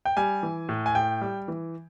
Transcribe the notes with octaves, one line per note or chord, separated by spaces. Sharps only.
G5
G3 G#5
E3
A2
G#5
A2 G5
G3
E3